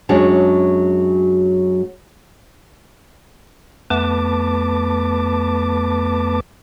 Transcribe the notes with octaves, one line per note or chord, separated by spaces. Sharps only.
F#2 F#3 G#3 D4
F2 A3 B3 B4 A5 D6